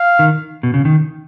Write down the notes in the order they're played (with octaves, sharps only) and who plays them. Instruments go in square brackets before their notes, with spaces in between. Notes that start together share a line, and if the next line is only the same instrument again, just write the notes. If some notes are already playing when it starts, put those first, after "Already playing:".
Already playing: [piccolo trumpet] F5
[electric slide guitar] D#3
B2
C#3
D#3